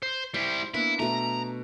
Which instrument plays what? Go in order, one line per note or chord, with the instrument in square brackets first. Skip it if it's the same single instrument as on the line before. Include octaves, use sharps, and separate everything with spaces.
[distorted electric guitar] C5
[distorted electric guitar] G3 E4 [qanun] C5
[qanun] A#3 B3 D4 [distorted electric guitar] E4
[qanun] B2 A3 [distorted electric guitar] A#5